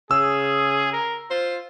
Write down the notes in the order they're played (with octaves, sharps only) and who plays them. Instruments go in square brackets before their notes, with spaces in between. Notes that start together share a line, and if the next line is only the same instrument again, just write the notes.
[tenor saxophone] C#3 [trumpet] G#4 [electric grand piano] E6
[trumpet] A#4
[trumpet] F4 [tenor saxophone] C5